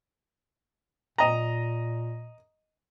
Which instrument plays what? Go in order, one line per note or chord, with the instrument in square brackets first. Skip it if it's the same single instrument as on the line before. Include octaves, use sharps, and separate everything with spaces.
[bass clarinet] A#2 [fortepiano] D#5 A#5